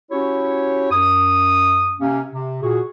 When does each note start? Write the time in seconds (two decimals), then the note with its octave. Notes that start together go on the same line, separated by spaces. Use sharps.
0.11 C#4 E4 F#4 G4 C#5
0.91 F#2 D#6
2.00 C3 A#3 C#4
2.32 C3
2.62 A#2 F#4 G#4